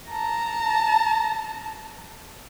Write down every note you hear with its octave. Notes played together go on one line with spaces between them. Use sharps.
A5 A#5